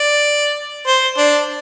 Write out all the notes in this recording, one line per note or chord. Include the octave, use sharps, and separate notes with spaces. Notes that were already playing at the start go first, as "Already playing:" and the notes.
Already playing: D5
C5
D4